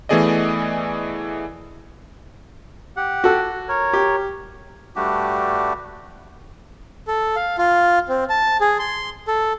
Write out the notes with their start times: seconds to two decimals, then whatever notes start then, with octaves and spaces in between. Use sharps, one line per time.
0.09 E3 A3 B3 G#4 D5 D#5
2.97 G4 F#5
3.24 F#4 A4
3.69 A#4 C#5
3.93 G4
4.95 G2 G3 A3 D4 F#4 G4
7.07 A4
7.36 F5
7.58 F4
8.08 C4
8.30 A5
8.61 G#4
8.79 C6
9.28 A4